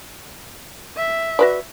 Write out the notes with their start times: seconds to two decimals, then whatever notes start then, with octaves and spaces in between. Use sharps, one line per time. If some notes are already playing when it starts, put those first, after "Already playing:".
0.96 E5
1.39 F#4 B4 D5